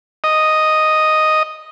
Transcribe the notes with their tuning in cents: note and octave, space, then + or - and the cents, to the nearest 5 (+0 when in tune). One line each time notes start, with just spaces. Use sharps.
D#5 +0